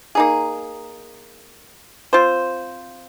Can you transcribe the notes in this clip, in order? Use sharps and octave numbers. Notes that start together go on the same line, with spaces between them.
A#3 D#4 G#4
C4 F4 C5